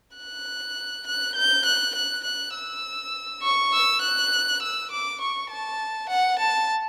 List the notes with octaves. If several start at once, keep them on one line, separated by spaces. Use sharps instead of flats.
F#6
F#6
G6
F#6
F#6
F#6
E6
C#6
E6
F#6
E6
D6
C#6
A5
F#5
A5